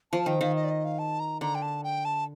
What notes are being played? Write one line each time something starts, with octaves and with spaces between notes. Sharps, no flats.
F3 A5
D#3 G5
D#3 F5
D#5
D5
D#5
F5
A5
A#5
D3 A#5
G5
A5
G5
A5